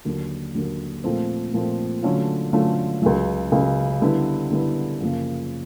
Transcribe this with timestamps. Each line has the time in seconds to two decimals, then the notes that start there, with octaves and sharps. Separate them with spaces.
0.05 D#2 D3 F#3
0.55 D#2 D3 F#3
1.04 A#2 F3 A3 C4
1.53 A#2 F3 A3 C4
2.03 D3 F#3 A3 C#4 F4
2.53 D3 F#3 A3 C#4 F4
3.02 C#2 C#3 F#3
3.52 C#2 C#3 F#3
4.01 D3 G3 B3 E4
4.50 D3 G3 B3 E4
5.00 F#2 C#3 F3 A#3